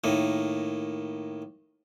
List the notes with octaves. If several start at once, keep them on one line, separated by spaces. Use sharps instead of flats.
A2 D#3 A#3